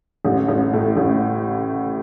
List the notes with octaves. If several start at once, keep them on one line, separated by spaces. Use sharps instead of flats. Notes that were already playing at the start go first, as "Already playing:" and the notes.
A1
A1
A2
A1